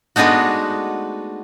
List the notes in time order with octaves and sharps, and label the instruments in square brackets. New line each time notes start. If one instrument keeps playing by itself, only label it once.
[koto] G#3 A3 B3 D4 D#4 F#4